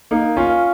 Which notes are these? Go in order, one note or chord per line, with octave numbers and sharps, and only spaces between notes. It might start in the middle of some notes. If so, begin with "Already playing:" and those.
A#3 D#4
C#4 F4